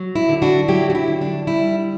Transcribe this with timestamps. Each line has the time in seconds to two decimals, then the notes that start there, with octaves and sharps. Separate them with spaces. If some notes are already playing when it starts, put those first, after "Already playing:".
Already playing: F#3
0.15 E4
0.29 D3
0.42 D4 F#4
0.68 F#3 E4 G4
0.90 F#4
0.95 E4
1.08 D3
1.21 D4
1.47 G3 E4